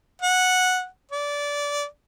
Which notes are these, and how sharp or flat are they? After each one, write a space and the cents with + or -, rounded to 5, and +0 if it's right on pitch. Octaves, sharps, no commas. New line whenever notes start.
F#5 -10
D5 -20